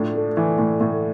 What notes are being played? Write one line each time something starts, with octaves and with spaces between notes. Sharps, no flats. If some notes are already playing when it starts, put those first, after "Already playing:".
Already playing: A2 F3 D4
A3
E3
A2
A2